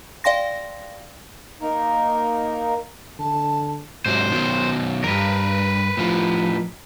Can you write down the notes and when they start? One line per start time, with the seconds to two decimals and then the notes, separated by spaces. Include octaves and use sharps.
0.24 D5 F5 G5 C6 A#6
1.61 A#3 D#4 A#4
3.19 D3 A5
4.06 G#2 C3 F#3 C5
4.31 B2 D#3 F#3
5.04 E2 G2 A#4 B4
5.97 A2 F3